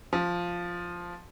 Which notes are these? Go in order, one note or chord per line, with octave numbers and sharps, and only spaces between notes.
F3